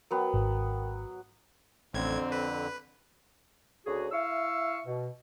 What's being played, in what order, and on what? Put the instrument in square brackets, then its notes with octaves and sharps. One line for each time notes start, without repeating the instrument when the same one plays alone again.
[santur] F#3 B3 [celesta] A#4 G5
[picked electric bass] G#1
[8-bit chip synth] A1 G#6 [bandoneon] F2 D3 [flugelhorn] C4
[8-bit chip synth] B4
[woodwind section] D2 C#3 F#4 G#4
E4 E5 F5 C#6 E6
B2